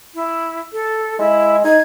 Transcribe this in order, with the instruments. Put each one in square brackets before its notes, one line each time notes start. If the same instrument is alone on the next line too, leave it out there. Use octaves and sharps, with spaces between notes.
[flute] E4
A4
[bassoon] G#3 [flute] E4
[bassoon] D#4 [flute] G#6